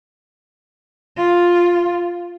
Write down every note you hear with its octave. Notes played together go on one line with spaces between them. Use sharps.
F4